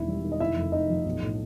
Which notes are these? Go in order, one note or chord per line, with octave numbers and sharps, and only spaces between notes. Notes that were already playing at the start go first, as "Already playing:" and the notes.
Already playing: E1 D#3 E4 E5
G3
D#3
D#5
F1 E4 E5
F2
F1 D#4 D#5
F3
B1
A2